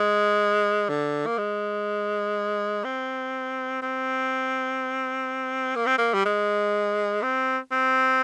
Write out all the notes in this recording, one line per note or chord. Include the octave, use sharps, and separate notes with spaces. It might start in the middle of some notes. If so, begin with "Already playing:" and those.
Already playing: G#3
D3
A#3
G#3
C4
C4
A#3
C4
A#3
G3
G#3
C4
C4